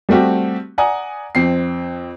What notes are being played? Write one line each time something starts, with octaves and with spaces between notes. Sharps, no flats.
G3 A3 C4 F#4 G4
D5 F#5 G#5 A#5 D#6
F2 C4 C7